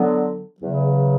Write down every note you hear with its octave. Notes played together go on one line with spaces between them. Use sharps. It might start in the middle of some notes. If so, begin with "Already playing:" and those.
Already playing: D3 F#3 B3
E2 C#3 F#3